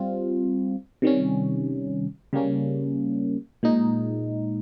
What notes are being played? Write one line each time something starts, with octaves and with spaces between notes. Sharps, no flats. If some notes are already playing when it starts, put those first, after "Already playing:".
Already playing: G3 C4 F4
C3 D#3 G3 C#4
C#3 G3 A#3 C#4
A#2 G#3 D#4